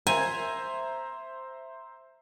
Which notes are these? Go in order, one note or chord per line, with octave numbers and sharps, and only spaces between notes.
C5 E5 G#5 A#5